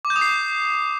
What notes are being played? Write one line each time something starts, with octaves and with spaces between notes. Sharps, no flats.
D6
G6
D#6
C7